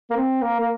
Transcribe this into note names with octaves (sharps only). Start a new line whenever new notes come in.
A#3
C4
A#3
A#3